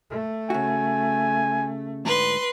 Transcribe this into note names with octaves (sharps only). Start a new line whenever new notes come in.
A3
C#3 F#4 G#5
D2 G#2 D3 B4 C6